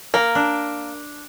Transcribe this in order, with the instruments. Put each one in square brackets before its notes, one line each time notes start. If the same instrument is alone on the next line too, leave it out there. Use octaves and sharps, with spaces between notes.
[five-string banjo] A#3 [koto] A#4
[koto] D4